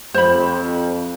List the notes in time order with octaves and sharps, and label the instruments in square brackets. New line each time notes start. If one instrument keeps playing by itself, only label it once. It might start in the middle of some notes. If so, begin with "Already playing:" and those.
[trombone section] F2 [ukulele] C5 B5